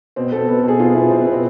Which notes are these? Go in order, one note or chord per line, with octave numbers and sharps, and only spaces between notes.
B2 C4
B2 A4
B2 B4
A4
B2
G#4
B2 F4
B2 E4
B2 C4
B3
B2
C4